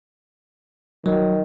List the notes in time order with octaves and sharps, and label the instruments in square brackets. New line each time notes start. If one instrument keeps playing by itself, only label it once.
[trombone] D#3 [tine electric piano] F#3